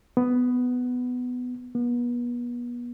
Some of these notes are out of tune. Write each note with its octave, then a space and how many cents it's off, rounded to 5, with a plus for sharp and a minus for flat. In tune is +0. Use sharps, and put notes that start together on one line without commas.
B3 +10
B3 -35